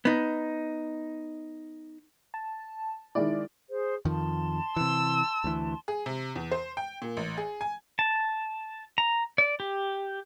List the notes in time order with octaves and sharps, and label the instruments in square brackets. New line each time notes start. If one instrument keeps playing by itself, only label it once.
[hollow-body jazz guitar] B3 D#4
[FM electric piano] A5
[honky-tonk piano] D#3 G#3 D5 [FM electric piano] E4
[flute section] G#4 C5
[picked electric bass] F2 D#3 F3 [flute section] A5 C6
[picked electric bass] C3 E3 [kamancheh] E6
[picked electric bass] D2 E3
[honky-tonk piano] G#4
C3
E2
C5
G5
A#2
A1
G#4
G#5
[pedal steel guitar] A5
A#5
D5
G4